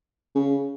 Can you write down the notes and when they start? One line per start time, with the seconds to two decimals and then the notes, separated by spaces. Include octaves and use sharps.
0.35 C#3